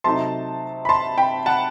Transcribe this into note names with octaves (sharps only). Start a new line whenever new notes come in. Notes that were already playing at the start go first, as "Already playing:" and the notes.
C3 F#3 A3 D#4 A5 C6
B5
A5 C6
G5 B5
F#5 A5